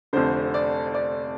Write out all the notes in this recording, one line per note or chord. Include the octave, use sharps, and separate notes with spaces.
F1 F2 D3 C5
D5
D5